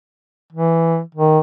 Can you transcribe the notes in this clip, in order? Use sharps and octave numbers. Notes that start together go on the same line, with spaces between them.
E3
D#3